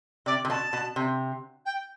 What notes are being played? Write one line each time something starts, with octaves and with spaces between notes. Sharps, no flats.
C3 D5
C3
B2 A5
B2
C3
G5